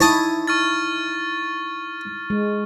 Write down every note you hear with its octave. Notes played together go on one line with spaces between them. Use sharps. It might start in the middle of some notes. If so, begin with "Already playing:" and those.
D#4 E4 C#5 A5 D#6
C#6 F6 A6
G#3